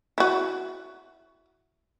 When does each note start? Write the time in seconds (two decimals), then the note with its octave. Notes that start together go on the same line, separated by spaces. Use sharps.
0.18 E4 F#4